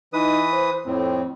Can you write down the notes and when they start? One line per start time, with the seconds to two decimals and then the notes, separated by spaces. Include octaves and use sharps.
0.13 E3 D#4 B4 D#6
0.53 C5
0.86 F2 A2 C4